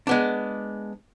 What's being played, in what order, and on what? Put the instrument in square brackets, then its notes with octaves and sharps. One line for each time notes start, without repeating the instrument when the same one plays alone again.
[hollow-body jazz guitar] G#3 B3 D4